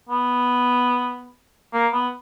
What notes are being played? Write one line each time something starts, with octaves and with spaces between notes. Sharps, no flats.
B3
A#3
B3